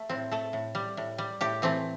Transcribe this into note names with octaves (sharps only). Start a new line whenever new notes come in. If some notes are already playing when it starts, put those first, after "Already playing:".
Already playing: A3
A2 C4
A3 A4
A2
G3
A2
G3
A2 G4
E3 A3 C4